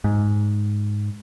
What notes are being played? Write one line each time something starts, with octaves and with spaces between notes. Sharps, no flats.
G#2